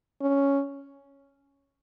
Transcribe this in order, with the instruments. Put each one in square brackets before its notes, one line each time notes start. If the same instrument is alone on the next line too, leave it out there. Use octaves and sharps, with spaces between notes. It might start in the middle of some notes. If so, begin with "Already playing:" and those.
[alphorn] C#4